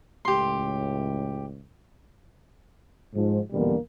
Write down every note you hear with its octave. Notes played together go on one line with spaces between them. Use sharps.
C#2 A2 G4 C6
G#2 F3
A#1 E2 B2 D3 G3 A#3